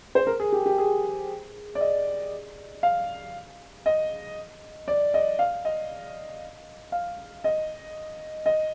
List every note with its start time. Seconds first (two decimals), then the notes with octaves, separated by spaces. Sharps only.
0.15 C5
0.27 A#4
0.40 G#4
0.52 G4
0.66 G4
0.78 G#4
1.75 D5
1.81 D#5
2.83 F5
3.86 D#5
4.88 D5
5.14 D#5
5.39 F5
5.65 D#5
6.92 F5
7.44 D#5
8.46 D#5